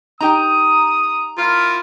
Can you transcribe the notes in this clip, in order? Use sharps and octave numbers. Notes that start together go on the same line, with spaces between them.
D#4 G4 G5 A#5 D#6
A#3 E4 F4 A#4